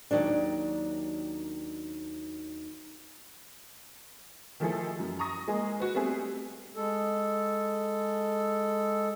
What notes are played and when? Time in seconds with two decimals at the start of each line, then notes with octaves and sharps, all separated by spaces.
0.11 D#2 G#2 D#3 F#3 D4
4.60 D#3 F3 A3 E4 G#4 A4
4.99 F#2
5.19 A#5 C#6 D#6 A#6
5.48 G#3 A#3 G#4
5.80 F#4 B4
5.95 G3 A3 B3 C4 G#4
6.76 G#3 A4